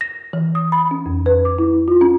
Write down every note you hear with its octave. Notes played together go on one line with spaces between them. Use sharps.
A#6
E3
D#6
B5
C#4
F2
B4
D6
E4
F4
C#4